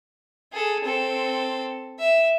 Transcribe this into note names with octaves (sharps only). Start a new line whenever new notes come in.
G#4 A4
C4 A4
E5